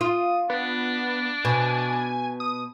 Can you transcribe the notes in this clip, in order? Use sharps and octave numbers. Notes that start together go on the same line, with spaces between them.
F4 D#6
B3 D4
B2 G#5
D#6